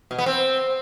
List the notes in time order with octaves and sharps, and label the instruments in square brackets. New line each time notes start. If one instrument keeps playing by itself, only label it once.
[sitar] B2
B3
C4